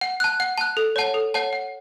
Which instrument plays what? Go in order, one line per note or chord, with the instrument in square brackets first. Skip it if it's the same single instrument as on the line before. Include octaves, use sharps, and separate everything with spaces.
[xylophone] F#5
A5 F#6
F#5
A5 F#6
A4
C#5 F#5 A5
A4
C#5 F#5 A5
F#5